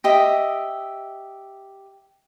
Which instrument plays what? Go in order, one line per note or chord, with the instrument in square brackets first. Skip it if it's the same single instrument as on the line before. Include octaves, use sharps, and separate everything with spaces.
[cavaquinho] G4 D#5 E5